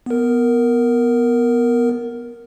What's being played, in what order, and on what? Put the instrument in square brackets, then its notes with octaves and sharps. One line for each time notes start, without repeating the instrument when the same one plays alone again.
[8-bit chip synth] B3 A#4